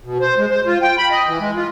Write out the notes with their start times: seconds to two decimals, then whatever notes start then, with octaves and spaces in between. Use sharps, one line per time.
0.05 B2
0.20 C5
0.38 G#3
0.50 C5
0.66 F4
0.82 G5
0.98 B5
1.11 D#5
1.27 E3
1.40 G#3
1.56 F4